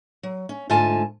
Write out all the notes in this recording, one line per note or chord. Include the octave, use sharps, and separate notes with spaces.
F#3
C#4
G#2 D3 A3 F4 G#5 A5